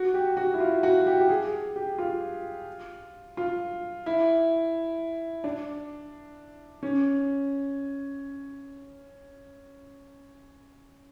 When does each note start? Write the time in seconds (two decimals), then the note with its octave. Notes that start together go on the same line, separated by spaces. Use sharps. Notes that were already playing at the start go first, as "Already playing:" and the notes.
Already playing: F#4
0.14 G4
0.37 F#4
0.54 E4
0.60 F4
0.83 F#4
1.06 G4
1.20 G4
1.29 G#4
1.76 G4
1.98 F4
3.37 F4
4.06 E4
5.44 D4
6.83 C#4